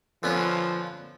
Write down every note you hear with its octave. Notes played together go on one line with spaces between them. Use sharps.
D3 F3 B3 C#4